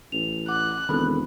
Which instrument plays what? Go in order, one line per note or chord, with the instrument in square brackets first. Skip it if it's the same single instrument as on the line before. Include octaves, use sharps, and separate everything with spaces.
[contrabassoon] A1 [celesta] F7
[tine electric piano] F#5 [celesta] D6 [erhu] F#6
[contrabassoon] E1 [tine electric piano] D#3 C4 A4 [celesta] B5